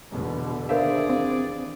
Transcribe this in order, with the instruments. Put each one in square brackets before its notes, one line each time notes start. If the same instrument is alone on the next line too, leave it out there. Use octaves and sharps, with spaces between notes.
[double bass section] E2 B2 D3
[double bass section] D#2 [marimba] D4 F5 [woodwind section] G#4 D5 [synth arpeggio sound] A#4 C5 E5
[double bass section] E3 [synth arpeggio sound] C4